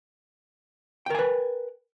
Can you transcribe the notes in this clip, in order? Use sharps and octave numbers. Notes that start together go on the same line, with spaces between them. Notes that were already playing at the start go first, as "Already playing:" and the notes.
A#4 B4 G5 G#5